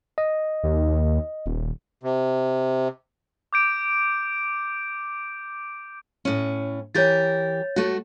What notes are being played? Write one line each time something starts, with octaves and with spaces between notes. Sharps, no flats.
D#5
D#2
D#1
C3
D6 G6 D7
A2 C#4
E3 G4 A#4 C#5 G6 A6
A3 F#4